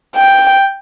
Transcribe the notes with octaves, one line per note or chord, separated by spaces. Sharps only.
G5